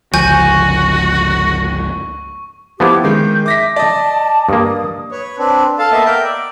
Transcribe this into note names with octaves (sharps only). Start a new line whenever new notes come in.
G1 C#2 F3 F#4 G#5 C#6 G6
F3 B3 E4 G4 D6
D#3 G#3 G6
E5 D6 A#6 B6
D5 D#5 A5
G2 A#3 D#6
B4 C#5
C4 D4 B4
A4 F5 A5
A#3 B3 D#5 E5 A5
A#4 E5 G5
D5